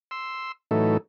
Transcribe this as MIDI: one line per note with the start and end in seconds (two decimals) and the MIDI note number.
0.11 0.52 84
0.11 0.52 88
0.71 0.97 45
0.71 0.97 52
0.71 0.97 54
0.71 0.97 57
0.71 0.97 63
0.71 0.97 69